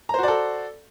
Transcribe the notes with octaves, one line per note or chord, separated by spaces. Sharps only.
F#4 A4 C5 D5 A#5